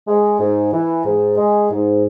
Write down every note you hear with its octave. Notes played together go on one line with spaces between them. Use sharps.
G#3
G#2
E3
G#2
G#3
G#2